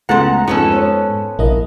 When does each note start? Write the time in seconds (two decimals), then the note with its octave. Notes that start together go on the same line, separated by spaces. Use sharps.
0.09 C#2 G#3 A3 B3 F#5 A#5 A6
0.47 F2 G#2 B3 C#4 A4
0.71 C5 C#5
1.39 A#1 A#3 E4 D#5